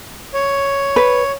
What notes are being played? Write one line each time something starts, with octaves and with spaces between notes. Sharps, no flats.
C#5
B4